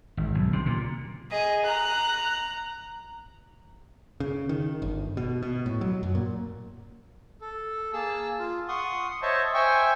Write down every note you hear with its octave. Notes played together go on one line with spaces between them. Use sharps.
G#1
B1
C3
A#2
G#4 D#5
A#5 F#6
C#3
D#3
G1
B2
B2
A2
F#3
F#2
A#2
A4
A#3 G#4 A5 E6
F4
F#5 C6 C#6 D#6
C5 C#5 D#5 E5 A5
C5 E5 G5 G#5 C#6